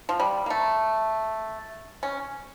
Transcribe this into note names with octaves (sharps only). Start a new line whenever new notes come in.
F3
G3
A#3
A3
C#4